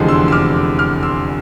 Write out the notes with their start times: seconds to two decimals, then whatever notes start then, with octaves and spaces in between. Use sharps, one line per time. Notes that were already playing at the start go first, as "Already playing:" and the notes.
Already playing: F1 E2 D3 F3 G#3
0.08 C6 E6
0.28 E6
0.32 D6 F6
0.79 D6 F6
1.03 C6 E6